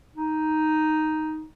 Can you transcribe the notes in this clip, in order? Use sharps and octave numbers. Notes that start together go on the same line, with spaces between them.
D#4